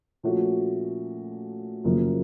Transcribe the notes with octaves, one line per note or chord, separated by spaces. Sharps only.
A#2 F3 A3 C#4 F#4
F#1 F#2 C#3 F3 A#3